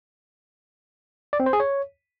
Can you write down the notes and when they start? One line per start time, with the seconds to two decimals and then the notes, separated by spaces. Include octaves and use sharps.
1.33 D5
1.40 C4
1.46 C5
1.53 G#4
1.60 C#5